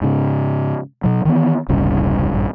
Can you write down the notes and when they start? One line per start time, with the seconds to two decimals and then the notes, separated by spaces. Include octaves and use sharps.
0.01 G#2 C#3
1.04 B2 F#3
1.25 D#3 E3 B3
1.69 E1 C2 G2 C#3
2.34 A#1 G2